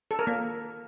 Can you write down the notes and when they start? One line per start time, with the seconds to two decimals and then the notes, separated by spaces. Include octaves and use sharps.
0.11 A4
0.19 A#4
0.27 A#3